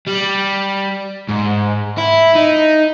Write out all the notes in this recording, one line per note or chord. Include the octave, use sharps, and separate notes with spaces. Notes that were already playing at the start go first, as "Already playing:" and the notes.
G3
G#2
E4
D#4